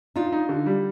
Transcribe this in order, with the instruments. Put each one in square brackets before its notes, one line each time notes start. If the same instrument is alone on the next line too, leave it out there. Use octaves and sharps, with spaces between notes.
[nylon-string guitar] D4 F4 [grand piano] D#4
[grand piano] D#4
D3
G3